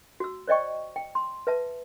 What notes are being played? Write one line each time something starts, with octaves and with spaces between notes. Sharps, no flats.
F#4 E6
C5 D5 D#5 G5 C#6
G5
C6
B4 E5 A5